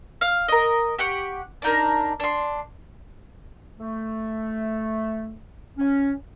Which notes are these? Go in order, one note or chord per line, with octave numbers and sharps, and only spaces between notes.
F5
A#4 D#5
G4 F#5 C#6
D4 D#4 A#4
D4 C6
A3
C#4